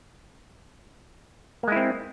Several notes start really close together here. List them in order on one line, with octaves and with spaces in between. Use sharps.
A#3 G#3 E4 C4